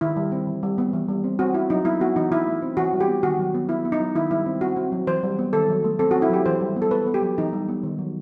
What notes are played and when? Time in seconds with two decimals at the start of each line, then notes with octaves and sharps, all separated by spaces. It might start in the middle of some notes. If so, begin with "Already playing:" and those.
0.01 D#3 E4
0.17 G3
0.32 C4
0.47 E3
0.63 G3
0.78 B3
0.93 E3
1.08 G3
1.24 C4
1.39 C4 F#4
1.54 C4 E4
1.70 F#3 D#4
1.85 B3 E4
2.00 B3 F#4
2.16 E3 D#4
2.31 E3 E4
2.47 A3
2.62 C4
2.77 E3 F#4
2.93 G3
3.01 G4
3.08 B3
3.23 D#3 F#4
3.39 F#3
3.54 B3
3.69 B3 E4
3.85 B3
3.92 D#4
4.00 F#3
4.15 D#3 E4
4.31 G3 E4
4.46 C4
4.61 C4 F#4
4.76 C4
4.92 F#3
5.07 E3 C5
5.23 G3
5.39 B3
5.53 D#3 A4
5.69 F#3
5.84 A3
5.99 C4 A4
6.11 C4 F#4
6.22 E4
6.30 F#3 G4
6.46 E3 C5
6.61 G3
6.76 B3
6.82 A4
6.91 B3 B4
7.07 B3
7.14 G4
7.22 F#3
7.38 E3 D#4
7.53 G3
7.69 B3
7.83 D#3
7.98 F#3